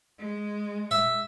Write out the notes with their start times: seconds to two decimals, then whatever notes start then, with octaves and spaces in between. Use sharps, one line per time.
0.18 G#3
0.91 E5